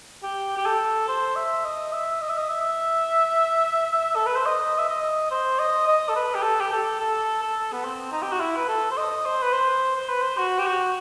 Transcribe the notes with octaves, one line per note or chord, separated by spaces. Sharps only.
G4
G4
A4
C5
E5
D#5
E5
D#5
E5
D#5
E5
A4
B4
C5
D#5
E5
D#5
C5
D#5
D#5
A4
B4
G4
A4
G4
A4
A4
A4
B3
C4
D#4
G4
F#4
E4
B4
A4
C5
D#5
C5
B4
C5
C5
B4
C5
F#4
G4
F#4